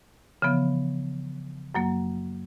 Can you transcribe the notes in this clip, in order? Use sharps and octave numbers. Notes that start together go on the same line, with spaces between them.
C#3 E3 F3 B3
F#2 F#3 A#3